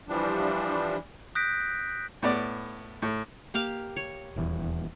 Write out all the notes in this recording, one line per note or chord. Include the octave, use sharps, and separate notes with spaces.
E3 F3 G3 D4
D#6 F#6 G6 A#6 B6 D7
A2 B3 D5
A2
A#3 G4 F5
C#5
D#1 E2